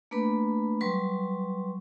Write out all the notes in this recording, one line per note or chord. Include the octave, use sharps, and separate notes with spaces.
A3 A#3 D4 B4 B5
F#3 G3 B4 C6 C#6